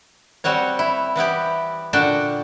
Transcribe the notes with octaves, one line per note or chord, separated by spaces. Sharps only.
G3 C4 F#4 C#5
E4
E3 B3 E4 G4
A#2 D3 D4 F#4 G5 A5